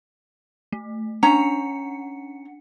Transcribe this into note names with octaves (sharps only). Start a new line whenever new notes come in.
A3
C#4 D4 F#5 A#5 C#7